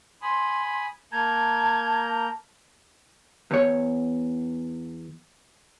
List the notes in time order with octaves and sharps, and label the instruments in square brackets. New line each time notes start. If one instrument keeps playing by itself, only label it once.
[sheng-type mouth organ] G#5 B5 D#6 [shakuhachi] C6
[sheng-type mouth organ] A#3 A#5 G6 [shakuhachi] A5 [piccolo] G#6
[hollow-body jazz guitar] E2 C#5